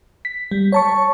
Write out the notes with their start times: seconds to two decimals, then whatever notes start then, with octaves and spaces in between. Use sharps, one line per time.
0.25 B6
0.51 G3
0.72 C#5 A5 C#6